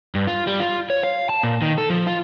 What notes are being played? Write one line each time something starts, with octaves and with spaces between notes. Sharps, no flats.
G2
F4
G3
F4
C#5
F5
A5
A#2
D#3
A4
F3
F4